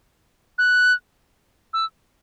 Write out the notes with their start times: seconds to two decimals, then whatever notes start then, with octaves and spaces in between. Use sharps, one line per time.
0.58 F#6
1.73 E6